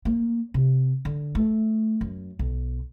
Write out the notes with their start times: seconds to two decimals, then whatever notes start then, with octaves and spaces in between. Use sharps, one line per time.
0.05 A#3
0.54 C3
1.05 D3
1.35 A3
2.01 F#2
2.39 B1